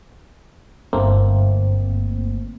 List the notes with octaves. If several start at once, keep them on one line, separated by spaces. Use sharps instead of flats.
G1 A3 A#3 C4